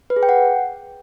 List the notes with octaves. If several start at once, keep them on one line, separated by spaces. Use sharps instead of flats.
B4
G#4
G5
F#5